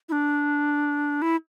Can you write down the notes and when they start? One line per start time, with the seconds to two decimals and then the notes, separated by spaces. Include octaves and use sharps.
0.09 E4
0.12 D4
1.22 E4